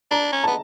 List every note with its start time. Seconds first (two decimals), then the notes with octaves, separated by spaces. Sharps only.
0.11 D4 A#5
0.32 C#4
0.44 B3 A5